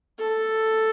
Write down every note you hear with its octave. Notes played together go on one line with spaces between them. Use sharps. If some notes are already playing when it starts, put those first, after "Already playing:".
A4